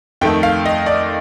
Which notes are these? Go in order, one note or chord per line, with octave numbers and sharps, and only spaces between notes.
F2 D#3 A3 G5
F5
D#5
D5